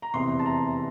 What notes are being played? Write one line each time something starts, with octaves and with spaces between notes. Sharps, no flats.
A#5
F1 E2 C3 E3 C6
A5
A#5